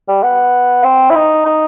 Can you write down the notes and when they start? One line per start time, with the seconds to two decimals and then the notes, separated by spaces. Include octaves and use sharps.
0.08 G3
0.23 B3
0.84 C4
1.10 E4
1.15 D#4
1.45 D#4